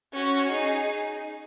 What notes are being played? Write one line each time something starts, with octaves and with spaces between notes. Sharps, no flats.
C#4 F#4
D#4 G#4